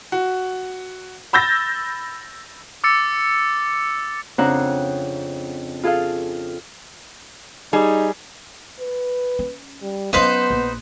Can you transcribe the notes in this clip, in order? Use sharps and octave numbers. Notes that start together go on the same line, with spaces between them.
F#4
B5 E6 G6 A6 A#6
D6 E6 A6 C#7
F2 C#3 C4 D4 F#5 A#5
F4 G#4 A4 F5
G3 D#4 G#4
B4
C#4
G3
F#3 B3 C#4 D#4 B4 C5
A#1